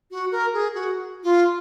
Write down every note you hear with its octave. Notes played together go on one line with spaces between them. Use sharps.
F#4
A#4
G#4
F#4
F4